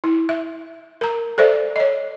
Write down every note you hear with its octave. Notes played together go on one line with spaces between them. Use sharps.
E4
E5
A#4 A#5
A4 C5 D5 E5
C#5 D#5